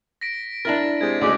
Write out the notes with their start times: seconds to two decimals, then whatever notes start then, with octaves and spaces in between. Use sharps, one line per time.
0.21 A#6 B6 D7
0.65 D4 E4 A#4 A6
1.01 C3 G#3 G#6 A6
1.21 D2 C#3 G#3 D5